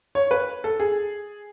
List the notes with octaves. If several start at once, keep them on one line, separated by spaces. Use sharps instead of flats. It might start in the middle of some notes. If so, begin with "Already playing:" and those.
C#5
B4
A4
G#4